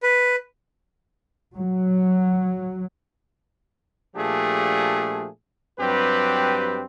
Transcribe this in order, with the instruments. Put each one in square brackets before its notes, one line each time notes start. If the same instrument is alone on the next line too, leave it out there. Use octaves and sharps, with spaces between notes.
[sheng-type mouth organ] B4
[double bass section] F#3
[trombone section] A#2 F3 A3 D4 G4 G#4
G2 F#3 C4 G4 B4